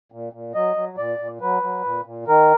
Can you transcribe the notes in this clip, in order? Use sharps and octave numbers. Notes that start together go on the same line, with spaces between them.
A#2
A#2
F#3 D#5
F#3
A#2 D5
A#2
F#3 B4
F#3
A#2
A#2
D#3 A#4